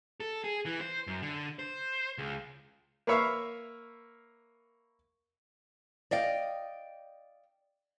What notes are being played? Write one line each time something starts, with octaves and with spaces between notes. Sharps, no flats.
A4
G#4
E3
C5
F#2
D3
C5
C#2
A#3 A#4 B4 C#5 E5 F5
D5 D#5 F5 G5